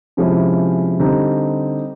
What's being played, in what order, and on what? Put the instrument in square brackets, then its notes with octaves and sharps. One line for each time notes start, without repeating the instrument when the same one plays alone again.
[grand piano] C3 F3 G#3 C#4 E4
D3 G3 C4 D#4 G4